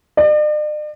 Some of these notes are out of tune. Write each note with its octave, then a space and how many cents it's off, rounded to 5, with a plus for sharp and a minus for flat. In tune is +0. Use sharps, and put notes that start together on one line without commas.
D5 +45